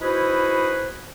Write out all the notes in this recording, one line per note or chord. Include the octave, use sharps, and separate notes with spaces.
D#4 E4 F#4 G#4 B4 C5